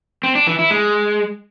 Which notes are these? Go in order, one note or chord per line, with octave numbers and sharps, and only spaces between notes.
C4
D4
E3
E4
G#3